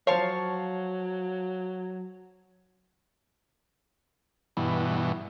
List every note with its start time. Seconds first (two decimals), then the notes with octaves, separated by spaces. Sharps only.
0.07 F3 F#3 C5 C#5 F5 A5 C#6
4.57 G2 B2 E3